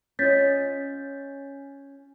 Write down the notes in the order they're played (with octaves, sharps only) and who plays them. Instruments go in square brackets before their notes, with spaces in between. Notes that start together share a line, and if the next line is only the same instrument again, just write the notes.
[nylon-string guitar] C#4 F4 D#5 [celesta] G6 A6 B6